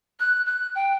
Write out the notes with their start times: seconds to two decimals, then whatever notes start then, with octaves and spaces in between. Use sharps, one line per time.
0.20 F#6
0.46 F#6
0.75 G5